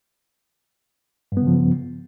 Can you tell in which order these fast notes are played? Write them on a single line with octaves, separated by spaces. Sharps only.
G2 B3 C#3 F3